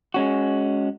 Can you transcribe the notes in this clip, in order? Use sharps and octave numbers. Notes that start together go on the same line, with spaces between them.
G#3 C#4 F#4